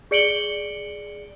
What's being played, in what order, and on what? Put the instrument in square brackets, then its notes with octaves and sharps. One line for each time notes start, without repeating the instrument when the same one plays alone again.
[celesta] G#4 D5 C#7 D7 F#7 G7